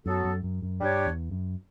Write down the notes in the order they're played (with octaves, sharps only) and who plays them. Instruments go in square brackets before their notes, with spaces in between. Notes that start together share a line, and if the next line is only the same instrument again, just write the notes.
[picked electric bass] F#2 [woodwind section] F#3 B3 F#4 A4
[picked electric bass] F#2
F#2
F#2
[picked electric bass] G2 [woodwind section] G3 D4 G4 C#5
[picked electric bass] E2
F#2